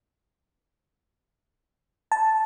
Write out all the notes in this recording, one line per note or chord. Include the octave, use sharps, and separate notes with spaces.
A5